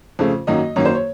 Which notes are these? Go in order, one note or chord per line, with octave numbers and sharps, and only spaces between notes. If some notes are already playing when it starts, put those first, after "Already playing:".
F2 C#3 A3
F#2 D#3 F#3 A#3 D#5
F#2 D#3 F#3 A#3 C#5
C5
C#5